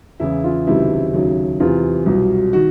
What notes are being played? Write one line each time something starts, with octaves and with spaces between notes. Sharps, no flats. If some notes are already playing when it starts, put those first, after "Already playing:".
E2 C#3 E3 E4
F4
C#2 C3 D#3 F#3 E4
D#2 C#3 F#3
E2 C3 E3 F4
C2 B2 F#3
D#3 F#4